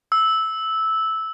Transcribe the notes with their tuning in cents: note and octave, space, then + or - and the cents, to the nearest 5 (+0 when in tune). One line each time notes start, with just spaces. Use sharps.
E6 -10